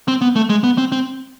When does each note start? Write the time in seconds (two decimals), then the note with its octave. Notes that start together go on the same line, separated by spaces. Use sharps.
0.08 C4
0.21 B3
0.36 A3
0.49 G#3
0.64 B3
0.78 C4
0.92 C4